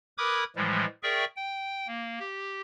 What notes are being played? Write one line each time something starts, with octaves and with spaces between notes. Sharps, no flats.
A#4 B4 B5 D6 D#6 G#6
A2 E3 F3 G3 G#3
G#4 A#4 D5 E5 G5 C#6
G5
A#3
G4